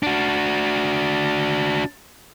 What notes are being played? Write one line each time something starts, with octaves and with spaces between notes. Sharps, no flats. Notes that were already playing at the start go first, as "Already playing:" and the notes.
D4 F#4